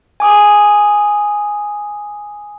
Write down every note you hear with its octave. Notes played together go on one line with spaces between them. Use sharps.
G#5 D6 D#6